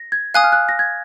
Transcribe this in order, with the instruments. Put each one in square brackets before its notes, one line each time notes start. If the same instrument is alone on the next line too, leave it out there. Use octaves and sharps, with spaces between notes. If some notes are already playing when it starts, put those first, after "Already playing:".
Already playing: [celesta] A#6
G#6
[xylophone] F5 G#5 D#6 [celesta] F#6
[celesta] F6
F#6
A#6
G#6